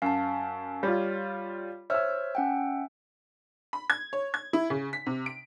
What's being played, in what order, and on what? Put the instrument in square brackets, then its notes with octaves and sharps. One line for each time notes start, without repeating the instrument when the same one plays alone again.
[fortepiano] F#2 [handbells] F5 A5
[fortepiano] G3 F4 [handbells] C#5
[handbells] C5 C#5 F6 [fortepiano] E5 E6
[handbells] C#4 F#5 G5
[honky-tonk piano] B5
G#6
C#5
G#6
E4
C#3
B6
C3
D7